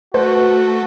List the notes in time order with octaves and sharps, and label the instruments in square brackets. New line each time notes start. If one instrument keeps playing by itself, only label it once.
[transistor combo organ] A3 [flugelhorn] F#4 [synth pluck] B4 C5